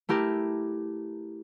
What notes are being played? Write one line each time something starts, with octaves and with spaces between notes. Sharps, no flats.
A3 E4 G4 A#4